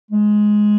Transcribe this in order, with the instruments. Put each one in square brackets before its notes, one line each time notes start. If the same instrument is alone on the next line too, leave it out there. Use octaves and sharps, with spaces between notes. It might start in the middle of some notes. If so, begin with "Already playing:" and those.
[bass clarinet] G#3